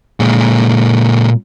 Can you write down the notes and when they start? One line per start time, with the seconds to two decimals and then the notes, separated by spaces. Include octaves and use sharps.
0.20 A#2 G#3